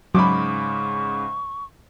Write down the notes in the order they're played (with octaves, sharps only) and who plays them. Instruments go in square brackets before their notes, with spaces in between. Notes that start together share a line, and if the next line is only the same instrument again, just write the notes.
[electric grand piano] G#2 C#3 [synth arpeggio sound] F#3 [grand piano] B5 D6 [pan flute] C#6